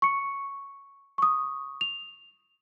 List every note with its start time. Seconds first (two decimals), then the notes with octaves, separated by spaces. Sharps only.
0.02 C#6 C#7
1.18 C#6 D#6
1.81 F7